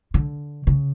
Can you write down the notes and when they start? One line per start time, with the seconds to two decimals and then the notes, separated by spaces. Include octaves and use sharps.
0.14 D3
0.67 C#3